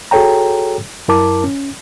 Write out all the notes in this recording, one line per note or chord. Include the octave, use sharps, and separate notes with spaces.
F#4 G#4 A4 C#5 G5 A#5
F#2 E4 A#4 A5 D6
C#4